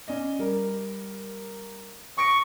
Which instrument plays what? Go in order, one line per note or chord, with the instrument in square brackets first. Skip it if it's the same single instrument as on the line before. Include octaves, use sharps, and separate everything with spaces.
[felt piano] C#4 D5 D#5
G3 A#4
[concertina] C#6 [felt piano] D#6 A#6 D7